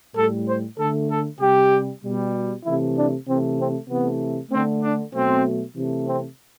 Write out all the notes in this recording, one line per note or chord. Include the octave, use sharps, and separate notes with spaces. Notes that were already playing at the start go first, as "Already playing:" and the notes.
A2 G3 A4
C5
D3 A3 A4
A4
C3 G3 G4
B2 G3
C3 E3 A3 E4
D4
C3 E3 A3 C4
C4
C3 E3 A3 B3
D3 A3 C4
D4
B2 F#3 A3 C4
C3 E3 A3
C4